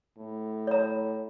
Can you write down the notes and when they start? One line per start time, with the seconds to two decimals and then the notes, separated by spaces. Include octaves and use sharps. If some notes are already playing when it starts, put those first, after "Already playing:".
0.18 A2
0.67 C#5 A#5